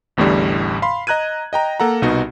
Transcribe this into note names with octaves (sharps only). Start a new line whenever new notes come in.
A1 E2 A2 D3 G3
F5 B5 C6
D#5 A#5 F#6 G#6 D#7
D#5 G5 A#5
A#3 A4 F#5 A#5
C2 B2 B3 D#4 F#4 C#6